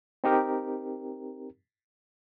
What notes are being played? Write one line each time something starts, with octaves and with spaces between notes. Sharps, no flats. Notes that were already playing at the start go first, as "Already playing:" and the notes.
C4 D#4 G4 A#4